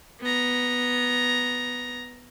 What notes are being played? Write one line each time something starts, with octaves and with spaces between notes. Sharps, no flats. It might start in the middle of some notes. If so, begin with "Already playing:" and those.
B3 A#5